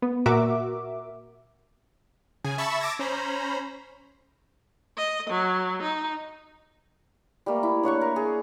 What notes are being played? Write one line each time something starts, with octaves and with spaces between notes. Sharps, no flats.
B3
A#2 F#4 A#4 E5 D6
C#3 G#4 G#5
E5 A5 B5 C#6 E6
A5 D6 E6 G#6 A#6
C#4 C5 A#5 B5
D#5
F#3
D#4
G3 A3 A#3
E4
D4 C#5 F#5 C#6
A#4
G#4